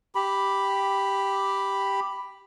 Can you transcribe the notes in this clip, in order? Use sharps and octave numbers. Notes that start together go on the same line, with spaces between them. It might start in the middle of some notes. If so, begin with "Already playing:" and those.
G4 B5